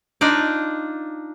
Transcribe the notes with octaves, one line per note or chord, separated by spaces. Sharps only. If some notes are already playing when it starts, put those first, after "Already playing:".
D4 D#4 F4 D5